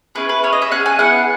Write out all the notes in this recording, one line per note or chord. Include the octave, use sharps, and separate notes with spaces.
C#4 E4 G#4 B4
B4
C#4 G#4 C#5
D#5
E5
C#4 G#4 F#5
G#5
B3 E4 G#4 F#5